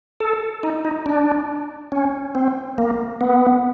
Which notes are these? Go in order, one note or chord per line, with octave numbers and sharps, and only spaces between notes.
A4
D#4
D#4
D4
C#4
C4
A#3
B3